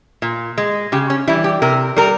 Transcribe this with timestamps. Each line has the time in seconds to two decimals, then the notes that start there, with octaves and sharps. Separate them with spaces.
0.22 A#2
0.58 G#3
0.92 C#3 G4
1.10 C#4
1.28 E3 G3 E4
1.44 G4
1.62 C3 A#4
1.97 G3 A#4